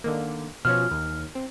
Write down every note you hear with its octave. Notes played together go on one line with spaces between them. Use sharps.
D3 D#3 A#3
B2 F3 C#4 F6
D#2
C4